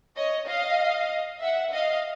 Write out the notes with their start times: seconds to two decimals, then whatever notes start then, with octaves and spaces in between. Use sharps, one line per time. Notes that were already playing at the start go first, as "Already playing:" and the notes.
0.15 C#5 D#5
0.47 D#5 F5
1.41 E5 F#5
1.72 D#5 F5